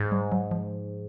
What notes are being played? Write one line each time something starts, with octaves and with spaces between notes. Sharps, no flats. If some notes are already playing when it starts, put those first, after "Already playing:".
Already playing: G#2
G3
F#3
F3